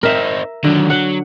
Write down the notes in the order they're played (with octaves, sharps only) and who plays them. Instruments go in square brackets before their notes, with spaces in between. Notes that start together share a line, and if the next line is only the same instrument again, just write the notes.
[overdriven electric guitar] C4 D#4 [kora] A#4 E5
[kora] D3 [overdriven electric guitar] D#3 F#3
[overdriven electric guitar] F#3 [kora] F#5